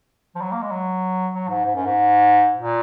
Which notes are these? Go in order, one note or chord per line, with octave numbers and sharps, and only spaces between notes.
F3
F#3
A#3
G#3
F#3
F#3
G#2
G#2
F#2
G#2
A#2